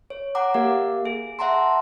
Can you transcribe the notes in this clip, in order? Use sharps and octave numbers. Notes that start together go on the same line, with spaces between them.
C#5
F#5 A#5 D6
A#3 G4 A#4 F5
G#4
E5 F#5 A5 A#5 C6